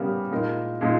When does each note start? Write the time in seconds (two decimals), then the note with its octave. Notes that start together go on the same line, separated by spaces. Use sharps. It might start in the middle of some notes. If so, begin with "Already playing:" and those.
Already playing: C#3 G3 B3 G4 A#4
0.31 A#2 G#3 D#4 A#4
0.81 A#2 G#3 D#4